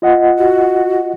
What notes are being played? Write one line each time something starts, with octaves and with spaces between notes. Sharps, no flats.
F4 D#5 F#5
F#4